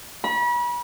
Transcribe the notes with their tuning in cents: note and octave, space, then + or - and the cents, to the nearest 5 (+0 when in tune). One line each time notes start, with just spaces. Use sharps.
B5 -35